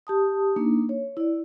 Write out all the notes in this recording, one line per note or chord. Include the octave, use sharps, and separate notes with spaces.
G4 A5 D#6
A#3 D4 D#4
C#5
E4 D5